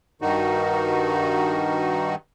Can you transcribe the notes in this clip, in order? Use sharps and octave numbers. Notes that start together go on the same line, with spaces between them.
G2 D#3 D#4 F#4